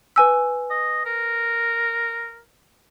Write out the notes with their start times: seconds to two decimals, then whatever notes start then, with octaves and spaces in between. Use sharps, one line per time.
0.16 B4 G#5 E6
0.70 D#5
1.05 A#4